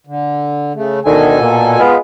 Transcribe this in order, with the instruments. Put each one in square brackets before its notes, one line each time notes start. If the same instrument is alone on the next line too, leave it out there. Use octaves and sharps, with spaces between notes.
[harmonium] D3
C#3 A3
[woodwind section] D2 D3 D#3 [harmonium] B2 A4 G#5
[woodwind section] A#2
G#3 B3 F4